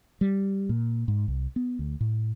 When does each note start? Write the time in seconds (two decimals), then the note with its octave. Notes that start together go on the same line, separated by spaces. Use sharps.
0.21 G3
0.69 A#2
1.08 G#2
1.28 C2
1.56 B3
1.79 D2
2.00 A2